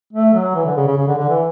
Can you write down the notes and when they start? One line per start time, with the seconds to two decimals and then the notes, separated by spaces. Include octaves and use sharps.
0.13 A3
0.34 F#3
0.55 E3
0.65 D3
0.77 C#3
0.87 C#3
0.98 C#3
1.08 D3
1.18 D3
1.29 E3